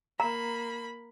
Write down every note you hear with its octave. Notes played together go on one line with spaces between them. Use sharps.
A#3 A#5 B5